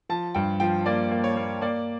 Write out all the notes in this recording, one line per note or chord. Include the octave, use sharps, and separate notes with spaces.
F3 A5
G2 G5
F3 G5
A#3 D5
A#3
C#5
A#3
A#3 D5